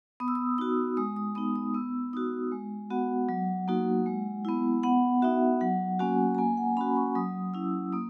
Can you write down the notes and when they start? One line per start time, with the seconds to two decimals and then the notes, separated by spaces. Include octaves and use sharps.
0.20 B3 D#6
0.28 E6
0.35 D#6
0.58 D#4 F#4 D#6
0.97 G#3 D#6
1.16 D#6
1.35 B3 D#4 D#6
1.56 D#6
1.74 B3 E6
2.13 D#4 F#4 D#6
2.52 G#3
2.90 B3 F#4 F#5
3.29 F#3
3.68 A#3 D#4 F#4
4.06 G#3
4.45 B3 E4
4.83 B3 F#5
5.22 D#4 F#4 E5
5.61 F#3 F#5
5.99 A#3 C#4 F#4 G#5
6.35 A#5
6.38 A#3 G#5
6.57 F#5
6.77 C#4 F#4 B5
6.96 C#6
7.15 F#3 D#6
7.54 C#4 E4 E6
7.93 A#3 D#6